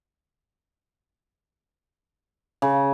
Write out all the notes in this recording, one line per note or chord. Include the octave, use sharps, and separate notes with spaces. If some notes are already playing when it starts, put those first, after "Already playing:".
C#3